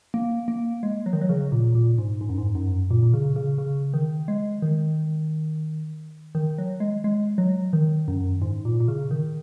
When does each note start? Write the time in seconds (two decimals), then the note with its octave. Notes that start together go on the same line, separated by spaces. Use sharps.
0.14 A#3
0.48 A#3
0.83 G#3
1.06 F#3
1.13 D#3
1.22 F#3
1.29 C#3
1.52 A#2
1.75 A#2
1.98 G#2
2.21 G#2
2.29 F#2
2.38 G#2
2.55 F#2
2.91 A#2
3.03 A#2
3.14 C#3
3.36 C#3
3.58 C#3
3.94 D#3
4.28 G#3
4.62 D#3
6.35 D#3
6.58 F#3
6.80 G#3
7.04 G#3
7.38 F#3
7.73 D#3
8.08 F#2
8.42 G#2
8.65 A#2
8.80 A#2
8.88 C#3
9.11 D#3